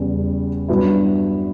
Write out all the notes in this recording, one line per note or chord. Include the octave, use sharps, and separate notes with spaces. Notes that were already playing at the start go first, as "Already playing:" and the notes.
Already playing: E2 C#3 G3
G2 F#3 B3 E4